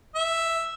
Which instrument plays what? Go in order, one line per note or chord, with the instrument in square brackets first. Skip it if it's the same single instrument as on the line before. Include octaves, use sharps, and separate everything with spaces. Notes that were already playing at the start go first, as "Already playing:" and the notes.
[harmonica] E5